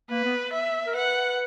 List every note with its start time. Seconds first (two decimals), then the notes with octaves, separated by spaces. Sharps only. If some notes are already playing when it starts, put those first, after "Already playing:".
0.10 A#3 B4
0.25 B3
0.53 E5
0.87 A#4
0.95 B4 F#5